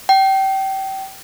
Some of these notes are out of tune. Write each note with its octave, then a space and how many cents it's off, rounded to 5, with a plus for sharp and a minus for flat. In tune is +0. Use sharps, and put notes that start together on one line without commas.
G5 -25